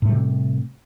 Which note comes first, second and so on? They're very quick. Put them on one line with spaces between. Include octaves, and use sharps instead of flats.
A2 A3 G3 C3